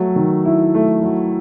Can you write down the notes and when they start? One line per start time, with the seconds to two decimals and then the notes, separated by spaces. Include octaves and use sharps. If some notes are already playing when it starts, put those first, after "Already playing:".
Already playing: F#3 A3
0.16 D#3
0.45 E4
0.74 A3
1.03 F#3